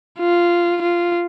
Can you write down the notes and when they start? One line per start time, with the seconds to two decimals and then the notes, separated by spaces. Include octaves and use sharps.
0.19 F4
0.82 F4